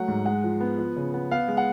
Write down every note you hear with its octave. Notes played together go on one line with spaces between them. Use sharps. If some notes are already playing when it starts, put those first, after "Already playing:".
Already playing: F#3 A3 F#5
G#2
G#3 F#5
F3
B3
F3
C#3
B3
B3 F5
G#3
F#5